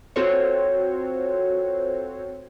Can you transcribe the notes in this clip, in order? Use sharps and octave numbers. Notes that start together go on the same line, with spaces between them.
C4 F4 F#4 A4 C5 C#5